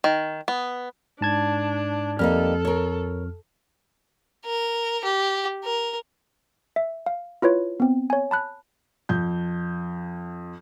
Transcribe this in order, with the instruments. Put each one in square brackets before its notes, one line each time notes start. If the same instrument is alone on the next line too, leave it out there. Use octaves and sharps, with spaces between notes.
[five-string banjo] D#3
B3
[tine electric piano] G#2 A5 G#6 [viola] D4
[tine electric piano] F2 F6 [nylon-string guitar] G3 A#3 D#4 [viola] A4
[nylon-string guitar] A#4 C#5
[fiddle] A#4
G4
A#4
[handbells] E5
F5
E4 F4 B4 C#5
B3 C4
C#5 G#5
A5 B5 F#6
[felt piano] F2 G6